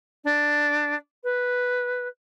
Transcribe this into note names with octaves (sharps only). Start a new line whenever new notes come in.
D4
B4